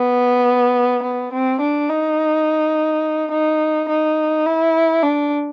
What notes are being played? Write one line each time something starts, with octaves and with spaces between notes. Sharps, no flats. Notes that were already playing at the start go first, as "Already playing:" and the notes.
Already playing: B3
B3
C4
D4
D#4
D#4
D#4
E4
D4